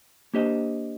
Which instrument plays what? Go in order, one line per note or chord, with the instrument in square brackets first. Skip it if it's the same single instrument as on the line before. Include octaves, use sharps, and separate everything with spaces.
[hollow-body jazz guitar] A#3 D4 G4 C5 D#5